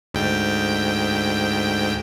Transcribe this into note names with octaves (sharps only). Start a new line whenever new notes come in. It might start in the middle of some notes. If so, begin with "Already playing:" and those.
D2 G#2 G5